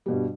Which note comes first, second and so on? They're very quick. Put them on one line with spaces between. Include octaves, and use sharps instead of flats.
G3 B2 G2